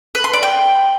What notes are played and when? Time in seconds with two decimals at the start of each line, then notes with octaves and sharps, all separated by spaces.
0.15 B4
0.24 C6
0.33 D5
0.43 G5